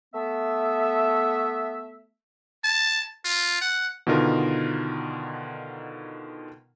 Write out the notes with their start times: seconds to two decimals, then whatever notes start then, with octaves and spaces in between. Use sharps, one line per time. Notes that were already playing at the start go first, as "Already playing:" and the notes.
0.14 A3 B3 E5
2.64 A5
3.25 F4
3.61 F#5
4.07 B2 D3 D#3 B3 F4 A#4